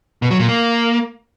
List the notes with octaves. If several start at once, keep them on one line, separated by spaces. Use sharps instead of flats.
B2
F#3
A#2
A#3